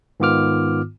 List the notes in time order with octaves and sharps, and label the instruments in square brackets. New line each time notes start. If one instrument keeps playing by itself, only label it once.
[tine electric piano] G#2 D#3 B3 F4 D6 F6